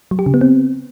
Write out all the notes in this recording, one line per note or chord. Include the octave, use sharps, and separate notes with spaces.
F#3
G4
C#3
B3
C4